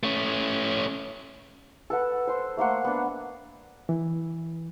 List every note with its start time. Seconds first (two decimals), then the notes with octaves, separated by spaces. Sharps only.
0.03 A3 C#4
1.90 A4 B4 F#5
2.27 C5 C6
2.57 A3 A#3 C5 F#5
2.85 B3 D4
3.89 E3